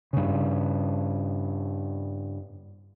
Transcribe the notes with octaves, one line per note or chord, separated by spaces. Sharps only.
G2 C#3